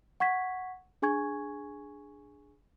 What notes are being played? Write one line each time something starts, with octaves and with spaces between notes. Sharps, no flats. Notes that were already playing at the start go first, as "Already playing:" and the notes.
F#5 C#6 G#6 B6
D4 G#4 G#5 C#6 G#6